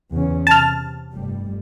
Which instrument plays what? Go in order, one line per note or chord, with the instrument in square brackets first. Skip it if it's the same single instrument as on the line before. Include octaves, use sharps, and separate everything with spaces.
[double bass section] E2 C#3 C#4
[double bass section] C3 [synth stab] A5 F6
[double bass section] F1 G2 G3